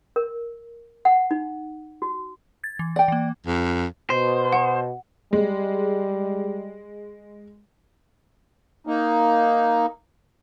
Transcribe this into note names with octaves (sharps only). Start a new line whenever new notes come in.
A#4
F#5
D#4
F#4
G#6 A6
E3
D5 F#5 G5
E3 A#3
F2
B2 C5
F#5
G3 G#3
A#3 D#4